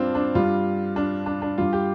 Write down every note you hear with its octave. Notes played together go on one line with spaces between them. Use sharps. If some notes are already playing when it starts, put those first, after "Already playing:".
Already playing: G2 G3 C4 D4 F4
D4
G2 G3 F4
D4
D4
D4
G2 G3 F4
G4